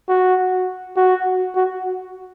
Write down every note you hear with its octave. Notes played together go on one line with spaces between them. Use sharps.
F#4
F#4
F#4